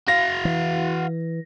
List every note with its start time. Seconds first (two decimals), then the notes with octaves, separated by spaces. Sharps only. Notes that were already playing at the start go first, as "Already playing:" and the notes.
0.08 F#4 F5 A#6
0.45 E3